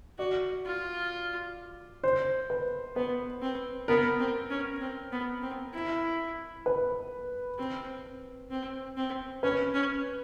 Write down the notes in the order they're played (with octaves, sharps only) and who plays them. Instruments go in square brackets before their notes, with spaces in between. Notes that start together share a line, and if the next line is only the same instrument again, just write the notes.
[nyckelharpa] F#4 [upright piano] D5
[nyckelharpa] F4
[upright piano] C5
B4
[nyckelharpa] B3 [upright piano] B4
[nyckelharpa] C4
[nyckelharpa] B3 [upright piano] A#4
[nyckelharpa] C4
C#4
C4
B3
C4
E4
[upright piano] B4
[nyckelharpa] C4
C4
C4
[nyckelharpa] C#4 [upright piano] B4
[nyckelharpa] C#4